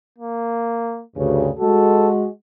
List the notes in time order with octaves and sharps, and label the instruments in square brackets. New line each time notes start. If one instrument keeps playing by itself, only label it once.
[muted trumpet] A#3
[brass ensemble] D2 G2 C#3
[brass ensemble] G#3 F#4 [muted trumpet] A4